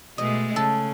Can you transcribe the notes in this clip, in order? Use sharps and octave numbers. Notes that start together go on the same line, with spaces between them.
B2 G#3 A3 D#5
C#3 A4